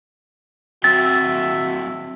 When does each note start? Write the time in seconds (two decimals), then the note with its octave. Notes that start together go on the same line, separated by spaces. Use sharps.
0.84 F#3 C4 F#4 E5 G5 A6